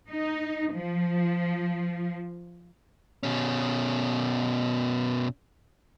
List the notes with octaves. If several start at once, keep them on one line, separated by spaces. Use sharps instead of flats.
D#4
F3
B2 C#4